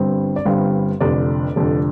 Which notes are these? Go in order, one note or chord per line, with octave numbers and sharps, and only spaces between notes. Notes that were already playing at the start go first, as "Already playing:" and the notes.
Already playing: G1 G2 G3 C4
D5
G1 G2 G3 C4 F5
F1 F2 D3 D5
F1 F2 D3